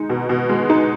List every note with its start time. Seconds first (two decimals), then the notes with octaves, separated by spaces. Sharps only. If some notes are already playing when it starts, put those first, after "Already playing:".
Already playing: G#3 D#4
0.09 B2
0.29 B2
0.49 G#3
0.70 D#4